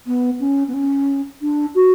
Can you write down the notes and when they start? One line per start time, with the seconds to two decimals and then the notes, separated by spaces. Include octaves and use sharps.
0.06 B3
0.40 C#4
0.68 B3
0.73 C#4
1.42 D4
1.75 F#4